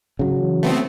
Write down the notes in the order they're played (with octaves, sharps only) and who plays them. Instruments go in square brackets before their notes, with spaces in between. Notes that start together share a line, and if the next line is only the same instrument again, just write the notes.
[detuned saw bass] G#2 [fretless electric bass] C#3 F#3
[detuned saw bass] E3
[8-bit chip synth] A3 B3 C4